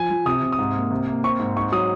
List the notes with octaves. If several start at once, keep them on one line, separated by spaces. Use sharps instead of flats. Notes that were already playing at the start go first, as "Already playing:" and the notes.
Already playing: F3 G#5
F3
C3 D#6
C3
D#6
G#2
A#3
C3
A#3
C4 C#6
G#2
G#2 C#6
F#3 D#6